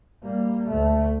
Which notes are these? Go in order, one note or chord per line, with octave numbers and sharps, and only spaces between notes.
G3 A#3
D2 A3